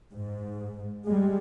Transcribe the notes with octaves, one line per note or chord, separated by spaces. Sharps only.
G#2
G3 G#3